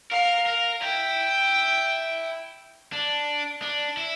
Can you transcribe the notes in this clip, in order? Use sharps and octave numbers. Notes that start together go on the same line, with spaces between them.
A#4 F5
A#4
E4 G5
D4
D4
E4